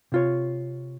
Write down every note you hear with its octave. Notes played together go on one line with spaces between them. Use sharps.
C3 F4 C#5